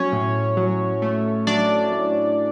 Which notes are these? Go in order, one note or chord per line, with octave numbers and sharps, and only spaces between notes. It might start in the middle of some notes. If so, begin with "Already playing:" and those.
Already playing: F#3 C#4 C#5
A2
F#3
A3
F#3 D4 D5
A2